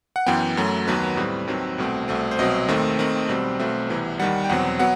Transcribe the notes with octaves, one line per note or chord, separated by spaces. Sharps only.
F#5
F#2 E3 B3 G5
F#2 F#3 A3
D#2 D#3 F#3 B3 B4
A2 G3 C4
D#2 D#3 F#3 C4
C2 B2 A3 C4
C2 B2 A3 C4
C5
C2 B2 F#3 C4 D#5
D#2 D#3 A3 C4
D#2 D#3 A3 C4
B1 B2 G3 C4
B1 B2 A3 C4 E5
C2 C3 E3 B3
D#2 D#3 G3 F#5
G5
E2 B2 F#3 C4 F#5
F#3 B3 F#5